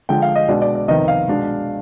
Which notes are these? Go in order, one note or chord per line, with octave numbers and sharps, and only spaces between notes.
D3 F3 G#3 G5
F5
D#5
B2 G#3 D4 D5
D5
D5
F2 C3 D#3 B3 D#5
F5
B2 G#3 D4